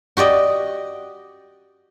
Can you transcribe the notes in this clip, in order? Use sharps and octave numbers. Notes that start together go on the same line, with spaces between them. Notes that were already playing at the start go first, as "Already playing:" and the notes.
F#4 G4 D5 D#5